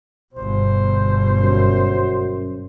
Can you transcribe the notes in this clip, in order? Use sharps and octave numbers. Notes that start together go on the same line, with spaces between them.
G1 B2 C5
F#2